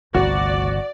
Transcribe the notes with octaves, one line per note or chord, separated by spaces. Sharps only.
G1 C#2 C3 A3 F#4 D5